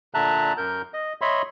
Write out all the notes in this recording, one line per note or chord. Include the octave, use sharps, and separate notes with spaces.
A#2 D3 E5 A5 A#5 F#6
F#2 A#4 G6
D#5
C#5 D#5 E5 B5 C6